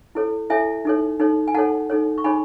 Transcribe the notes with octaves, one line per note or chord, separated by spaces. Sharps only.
E4 A4 C#5
E4 A4 C#5 E5 G#5
D#4 A4 C#5
D#4 A4 C#5
G#5
D#4 A4 C#5 F#5 A5
D#4 A4 C#5
C#6
D#4 G#4 C#5 G#5 B5